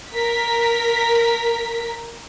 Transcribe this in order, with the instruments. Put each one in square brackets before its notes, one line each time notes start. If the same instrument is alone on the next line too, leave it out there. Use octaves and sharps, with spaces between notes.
[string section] A#4 B6